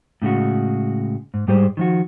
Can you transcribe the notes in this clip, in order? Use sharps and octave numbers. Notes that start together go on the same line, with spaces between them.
A2 C#3 G#3 F#4
G#2
G#2 G3 G4 G#4 C5
D#3 F3 F#4